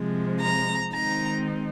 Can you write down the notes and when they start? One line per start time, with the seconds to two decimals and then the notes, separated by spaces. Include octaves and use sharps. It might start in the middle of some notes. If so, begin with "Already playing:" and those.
Already playing: C3 F3 G#3
0.40 A#5
0.92 D#3 G#3 C4 D#4 A#5